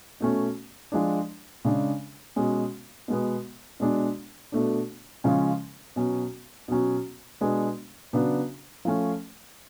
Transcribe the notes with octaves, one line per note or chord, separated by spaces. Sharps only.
B2 A3 C#4
F3 G#3 D4
C#3 G#3 D4
B2 G#3 C#4
B2 G#3 B3
B2 G#3 D4
B2 A3 D4
C#3 F3 G#3 C#4
B2 F#3 C#4
B2 F#3 C#4
B2 G#3 B3 D4
C#3 F#3 B3 D4
F3 A3 C#4